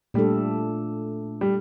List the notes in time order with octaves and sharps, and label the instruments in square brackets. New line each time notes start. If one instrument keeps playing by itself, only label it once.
[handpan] A#2 A3 D4 A4 [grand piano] G3
[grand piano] G3